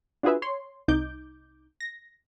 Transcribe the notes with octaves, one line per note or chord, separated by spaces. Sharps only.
D4 F4 F#4 G#4 B4 E5
C#5 C6
C2 D#4 D6 G6
A#6